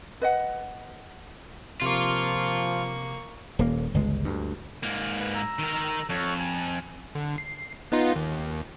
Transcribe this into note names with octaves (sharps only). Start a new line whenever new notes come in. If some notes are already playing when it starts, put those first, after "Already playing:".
B4 D#5 F#5
C3 F3 A#3 F4 C#6 D6
D#1 A#3
G1 C#2 G#3
D2 G2
G#2 A#3
B4
A#5 E6
D#3 A#4
F2 A4 C#5 C#6
G#5
D3
C7
B3 D#4 F4
D#2